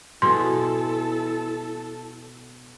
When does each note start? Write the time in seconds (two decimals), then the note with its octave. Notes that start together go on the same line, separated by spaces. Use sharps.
0.22 B2 B3 E4 G#4 A4 C6